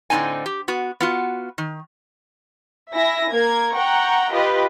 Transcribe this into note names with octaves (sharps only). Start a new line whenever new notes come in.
A2 D3 D#3 C4 D#4 G#5
G4
B3 F#4
B3 F4 F#4
D#3
E4 E5 G#5 A#6
A#3 A#4 G#6
F#5 G5 A#5 C#6
F4 G4 B4 D#5